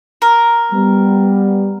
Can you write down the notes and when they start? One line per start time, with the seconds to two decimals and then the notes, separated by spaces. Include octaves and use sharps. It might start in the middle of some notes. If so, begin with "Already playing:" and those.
0.22 A#4
0.72 G3 B3